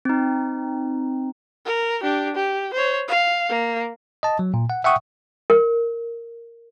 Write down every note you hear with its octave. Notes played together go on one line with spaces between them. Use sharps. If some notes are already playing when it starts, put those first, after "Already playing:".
C4 D#4
A#4
D4 G4
G4
C5 C#5
F5
A#3
D#5 A5
F#3
A#2
F#5
E5 F#5 G5 C#6 D#6
A#4